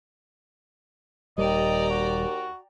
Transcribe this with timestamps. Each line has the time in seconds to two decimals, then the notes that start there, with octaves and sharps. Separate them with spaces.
1.38 D#1 D#2 G3 D5 D#5 G5 A#5
1.90 F#4